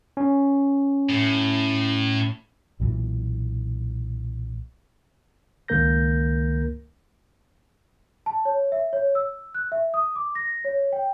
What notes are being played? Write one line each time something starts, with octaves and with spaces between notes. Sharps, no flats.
C#4
A2
B1 A#2 C#3 E3
C#2 D#3 A#3 A#4 G6 A#6
A5
C#5
E5
C#5
E6
F#6
E5
D#6
D6
A#6
C#5
G5